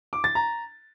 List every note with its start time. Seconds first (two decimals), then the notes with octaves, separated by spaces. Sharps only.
0.13 D6
0.24 A6
0.35 A#5